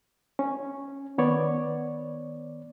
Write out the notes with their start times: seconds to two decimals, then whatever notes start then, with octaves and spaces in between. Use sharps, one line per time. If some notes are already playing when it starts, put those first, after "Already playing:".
0.39 C#4
1.18 D#3 B3 C#5 D5